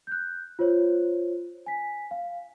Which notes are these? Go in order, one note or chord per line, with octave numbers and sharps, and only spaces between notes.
F#6 G6
F4 C5 C#5
G#5 B6
F5